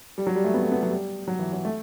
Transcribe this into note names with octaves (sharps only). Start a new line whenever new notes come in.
G3
F#3
G3
A3
B3
A3
B3
F#3
G3
F#3
E3
F#3
A3